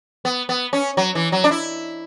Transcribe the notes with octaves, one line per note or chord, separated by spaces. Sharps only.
B3
B3
C#4
F#3
E3
F#3
D4
E4